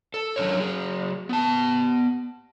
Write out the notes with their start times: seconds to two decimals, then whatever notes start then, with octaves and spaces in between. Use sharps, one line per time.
0.14 A4
0.36 F#3 D4 A4 A#4 C#5
0.59 F#3 G#4
1.29 B3 A5